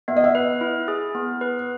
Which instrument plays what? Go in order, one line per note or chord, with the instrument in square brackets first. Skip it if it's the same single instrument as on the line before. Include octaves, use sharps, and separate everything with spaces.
[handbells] B3 [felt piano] E5
[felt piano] D#5
E5
[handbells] B4
E4
G#4
B3
B4